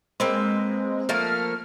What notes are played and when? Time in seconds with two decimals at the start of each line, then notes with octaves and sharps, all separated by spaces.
0.20 G#3 A#3 C4 B4
1.09 F3 A3 A#3 F6